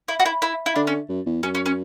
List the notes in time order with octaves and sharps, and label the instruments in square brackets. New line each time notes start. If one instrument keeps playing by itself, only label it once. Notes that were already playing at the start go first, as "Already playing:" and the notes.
[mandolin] E4
F#4
E4
E4
E4
[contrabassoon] D3 [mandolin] D4
[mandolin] C#4
[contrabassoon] F#2
E2
[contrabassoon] F#2 [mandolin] C#4
[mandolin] C#4
C#4